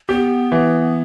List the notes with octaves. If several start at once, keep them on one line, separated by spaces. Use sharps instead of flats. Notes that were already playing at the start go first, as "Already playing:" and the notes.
B3 G4
E3